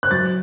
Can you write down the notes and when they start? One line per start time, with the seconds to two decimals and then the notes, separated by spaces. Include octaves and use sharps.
0.03 F#6
0.11 F#3 A6